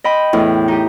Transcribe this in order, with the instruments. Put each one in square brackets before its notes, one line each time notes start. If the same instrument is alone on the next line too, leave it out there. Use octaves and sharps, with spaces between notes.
[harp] D#5 G5 B5
[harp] E2 [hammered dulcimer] A2
[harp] D#4 G4